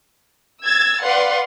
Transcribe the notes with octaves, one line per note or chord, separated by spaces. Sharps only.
E6 G#6 A6
B4 D5 F5 F#5 C6